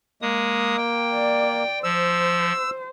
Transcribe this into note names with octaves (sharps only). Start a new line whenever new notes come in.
G#3 A#3 D#6
G5
D5
F3 C5 E6